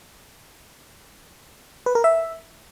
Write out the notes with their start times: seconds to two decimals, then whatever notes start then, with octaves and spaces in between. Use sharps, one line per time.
1.86 B4
1.95 A#4
2.04 E5